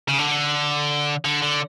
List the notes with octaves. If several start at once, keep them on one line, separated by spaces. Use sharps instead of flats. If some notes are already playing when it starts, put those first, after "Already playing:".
C#3
D3
D3
D3